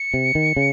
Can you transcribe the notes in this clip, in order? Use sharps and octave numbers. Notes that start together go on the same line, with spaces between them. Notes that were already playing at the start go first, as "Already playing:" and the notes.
Already playing: C#7
C3
D#3
C#3